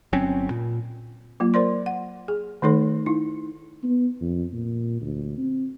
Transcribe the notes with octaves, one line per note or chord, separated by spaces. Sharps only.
G1 F#3 C4 C#4
A#2
F#3 A#3 F4
A#4 C5 D5 C6
F#5
G#4
D#3 A3 D#4 A4 C#5
D#4 E4
B3
F2
A#2
D2
C4